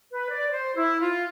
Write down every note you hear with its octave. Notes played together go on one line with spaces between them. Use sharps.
B4
D5
C5
E4
F4